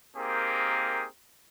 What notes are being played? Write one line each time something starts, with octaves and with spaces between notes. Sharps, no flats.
A#3 C4 D#4 G4 G#4 A#4